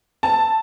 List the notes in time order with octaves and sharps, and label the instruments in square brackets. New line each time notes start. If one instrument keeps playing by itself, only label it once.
[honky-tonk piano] A5